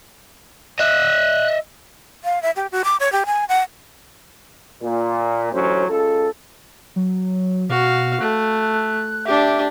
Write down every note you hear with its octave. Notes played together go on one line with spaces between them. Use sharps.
D#5 E5 F#6
F5
E5
G4
F#4
D6
C#5
G4
G#5
F#5
A#2
A1 D2 F#3 C#4 C5
C#2 A4
F#3
B2 F#4 F5
A3 F#6
D4 G4 E5